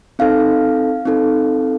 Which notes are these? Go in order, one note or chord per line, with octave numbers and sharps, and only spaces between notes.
C4 D#4 A4 F5
C4 D#4 A4